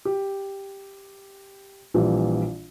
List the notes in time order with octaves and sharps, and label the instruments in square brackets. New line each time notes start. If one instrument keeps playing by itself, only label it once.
[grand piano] G4
A#1 A#2 E3 G3